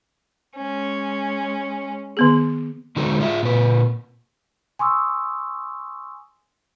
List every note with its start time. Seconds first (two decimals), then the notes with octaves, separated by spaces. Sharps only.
0.56 G#3 C#4
2.17 D#3 B3 G#4
2.96 D3 G#3 D#4 F#4 A4
3.21 F4 G#4 E5
3.43 A#2 B4
4.79 G#5 C6 C#6 D#6 E6